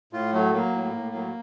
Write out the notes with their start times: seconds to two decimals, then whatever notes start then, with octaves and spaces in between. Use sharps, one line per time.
0.13 A2 F4
0.33 F#3 A3
0.53 F#3 A#3
0.73 A2
0.93 A2
1.14 F#3